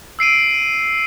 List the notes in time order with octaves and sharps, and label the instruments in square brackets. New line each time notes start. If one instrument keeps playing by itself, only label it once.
[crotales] E6 C7 D7 D#7